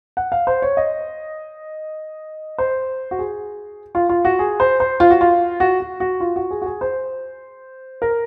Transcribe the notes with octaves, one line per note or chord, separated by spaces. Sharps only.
F#5
F5
C5
C#5
D#5
C5
F#4
G#4
F4
F4
F#4
G#4
C5
C5
F4
F#4
F4
F#4
F#4
F#4
F4
F#4
G#4
F#4
G#4
C5
A#4